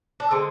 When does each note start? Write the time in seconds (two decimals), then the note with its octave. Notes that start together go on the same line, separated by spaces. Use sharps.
0.20 D4
0.31 D3 G#3 C4